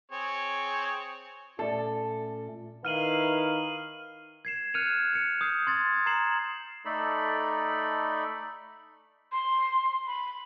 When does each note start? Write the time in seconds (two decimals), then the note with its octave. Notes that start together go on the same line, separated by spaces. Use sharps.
0.12 C4 G#4 C#5
1.59 A#2 A3 C#4 A4 D5 E5
2.85 D#3 E4 B4 F5 F6 D#7 F#7
4.45 G#6 C7 E7
4.74 F6 F#6 G#6 C#7 D#7 F7
5.13 F6 C#7
5.41 D#6 G6 C7
5.67 C6 G#6 A6
6.06 A#5 G#6 C7 E7 F#7
6.85 A3 D#4 A4 D5 B5
9.32 C6
10.07 B5